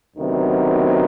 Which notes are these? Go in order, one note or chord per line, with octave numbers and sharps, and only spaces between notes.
D2 C3 D#3 F#3 B3